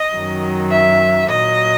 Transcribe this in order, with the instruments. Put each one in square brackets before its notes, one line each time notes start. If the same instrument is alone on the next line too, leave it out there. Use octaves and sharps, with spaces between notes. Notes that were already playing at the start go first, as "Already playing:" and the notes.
Already playing: [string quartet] D#5
F#2 D#3 F#3
E5
A#2 F#3 D#5